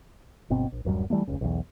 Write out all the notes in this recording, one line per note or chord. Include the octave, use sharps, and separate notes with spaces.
G1 B2 C4
A#1
D1 F#2 F#3 G3
E3 G3 A3 A#3
F1 C#2 C#3
B1 E2